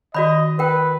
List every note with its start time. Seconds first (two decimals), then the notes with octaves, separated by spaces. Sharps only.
0.15 D#3 F#4 D5 D#5 B5
0.59 A#4 B4 G5